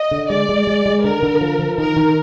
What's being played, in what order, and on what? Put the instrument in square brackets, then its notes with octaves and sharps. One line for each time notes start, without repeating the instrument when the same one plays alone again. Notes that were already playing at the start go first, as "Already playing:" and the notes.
Already playing: [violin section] D#5
[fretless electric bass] D3
[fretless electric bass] G#3 [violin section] D5
[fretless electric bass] G#3
G#3
G#3
[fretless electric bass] D3 [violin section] A#4
[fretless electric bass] D3
F3
F3
[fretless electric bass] D#3 [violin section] A#4
[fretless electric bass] D#3